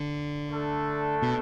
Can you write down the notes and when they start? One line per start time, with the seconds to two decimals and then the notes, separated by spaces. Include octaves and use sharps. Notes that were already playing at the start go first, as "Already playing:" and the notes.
Already playing: D3
0.48 A3 D4 A4
1.22 B2